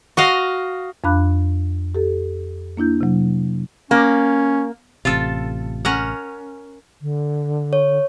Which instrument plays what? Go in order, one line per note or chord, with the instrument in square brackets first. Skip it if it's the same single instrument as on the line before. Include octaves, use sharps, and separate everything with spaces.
[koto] F#4 D#5 F5
[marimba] F2 D4 F5 B5 D6 F#6
G4 A4
A#3 D4 E4 G6
C3 F#3
[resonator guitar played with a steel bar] A#3 [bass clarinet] C#4
[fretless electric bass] A1 C3 [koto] F4 A4
[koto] C#4 A#4 F#5
[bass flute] D3
[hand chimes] C#5